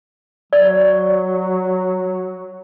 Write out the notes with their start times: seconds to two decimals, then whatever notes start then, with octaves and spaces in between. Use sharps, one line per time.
0.53 F#3 D5